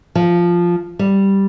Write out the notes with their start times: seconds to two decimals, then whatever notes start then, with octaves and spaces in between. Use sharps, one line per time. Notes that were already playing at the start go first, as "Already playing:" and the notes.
0.15 F3
0.99 G3